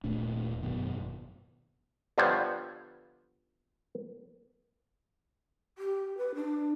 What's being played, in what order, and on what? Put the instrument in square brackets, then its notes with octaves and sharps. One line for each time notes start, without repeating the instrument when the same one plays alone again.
[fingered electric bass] D#1 A#2 A3 D4
G#1 F#2 B2 D#3
[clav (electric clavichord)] D3 F3 G3 B3 C5 C#5
[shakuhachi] G4
B4
D4